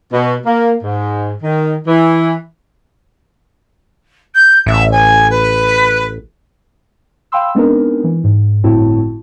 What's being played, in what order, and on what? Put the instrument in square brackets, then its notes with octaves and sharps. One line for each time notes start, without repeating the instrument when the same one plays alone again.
[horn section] B2
A#3
G#2
D#3
E3
[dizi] G6
[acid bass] A1 [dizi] E5
[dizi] G#5
B4
[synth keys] F5 G5 B5 C6 E6
G#3 B3 C4 D4 D#4 A#4
E3
G#2
G1 A2 C4 E4 F#4 A5